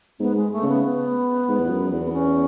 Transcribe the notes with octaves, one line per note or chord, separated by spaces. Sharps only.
G#2 B3
G#3
A3
C#3 B3
B3
G#2
E2
F#2
E2
B3
C#4